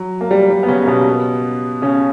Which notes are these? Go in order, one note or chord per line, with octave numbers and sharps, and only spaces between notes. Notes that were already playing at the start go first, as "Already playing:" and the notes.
Already playing: F#3
A#3
G3
G3
B3
C#3 C#4
A#3
B2 B3
C#3 C#4